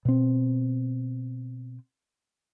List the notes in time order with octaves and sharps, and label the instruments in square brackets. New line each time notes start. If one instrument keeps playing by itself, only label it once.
[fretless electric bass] B2 C4